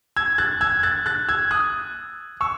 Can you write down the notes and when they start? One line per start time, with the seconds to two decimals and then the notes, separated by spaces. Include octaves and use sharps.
0.16 E6 G#6
0.38 F#6 A6
0.61 E6 G#6
0.83 F#6 A6
1.06 F#6 A6
1.28 E6 G#6
1.51 D#6 F#6
2.41 C#6 E6